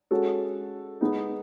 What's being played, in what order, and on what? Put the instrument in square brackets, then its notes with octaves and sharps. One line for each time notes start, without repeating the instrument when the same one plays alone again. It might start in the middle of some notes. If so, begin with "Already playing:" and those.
[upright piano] G#3 C#4 F#4 A4
G#3 B3 D#4